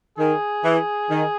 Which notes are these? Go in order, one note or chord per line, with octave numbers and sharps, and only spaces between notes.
D#3 G#4
E3
D#3